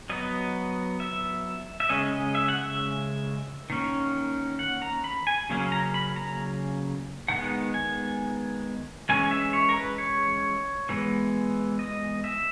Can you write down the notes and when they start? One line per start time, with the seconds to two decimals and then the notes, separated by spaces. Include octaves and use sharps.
0.10 F#3 B3 D#5
1.00 E5
1.80 E5
1.89 C#3 G#3 C#4 D#5
2.13 D#5
2.35 E5
2.48 F#5
2.57 E5
3.70 D#3 A#3 C#4
4.59 F#5
4.82 A#5
5.04 B5
5.27 G#5
5.49 C#3 F#3 A#3 C#4
5.72 A#5
5.94 B5
6.16 A#5
7.28 D#3 G#3 B3 F#5
7.74 G#5
9.09 E3 G#3 C#4 G#5
9.31 E5
9.53 C#5
9.69 A#4
9.76 B4
9.98 C#5
10.89 E3 G#3 B3
11.79 D#5
12.24 E5